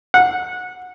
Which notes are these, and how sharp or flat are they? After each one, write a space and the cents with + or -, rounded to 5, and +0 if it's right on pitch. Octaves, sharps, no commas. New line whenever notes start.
F#5 -20